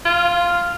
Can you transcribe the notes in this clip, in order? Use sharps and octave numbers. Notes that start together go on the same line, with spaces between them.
F4